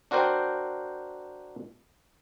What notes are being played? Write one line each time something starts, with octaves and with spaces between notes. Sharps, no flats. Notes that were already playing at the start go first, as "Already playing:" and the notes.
D4 F#4 A#4 C5 G5